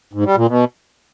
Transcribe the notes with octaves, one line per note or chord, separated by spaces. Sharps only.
G#2
G3
A#2
B2